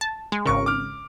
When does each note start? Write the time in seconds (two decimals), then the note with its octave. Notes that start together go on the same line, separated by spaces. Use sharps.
0.01 A5
0.32 G#3
0.46 G#1 C#3 A#4 C#6
0.66 D6 F6